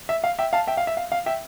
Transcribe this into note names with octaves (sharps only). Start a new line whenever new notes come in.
E5
F5
E5 G5
F5 A5
E5 G5
F5
E5
F5
F5
E5 G5